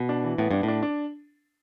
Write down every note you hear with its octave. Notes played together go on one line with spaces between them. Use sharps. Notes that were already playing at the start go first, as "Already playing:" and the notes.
Already playing: B2
D4
E3
A2 B3
G2 D4
A2
D4
D4